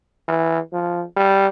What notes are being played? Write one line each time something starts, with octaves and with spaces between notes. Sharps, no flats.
E3
F3
G3